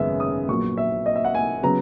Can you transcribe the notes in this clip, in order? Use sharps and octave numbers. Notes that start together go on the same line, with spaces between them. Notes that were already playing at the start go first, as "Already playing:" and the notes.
Already playing: G#1 F#2 C#3 G#3 B3 E5
D#6
A#1 A#2 F#3 B3 C#6
E5
D#5
E5
F#5
G#5
C#3 F#3 B3 A#5